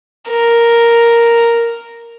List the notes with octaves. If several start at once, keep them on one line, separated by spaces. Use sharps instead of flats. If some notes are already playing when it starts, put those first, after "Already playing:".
A#4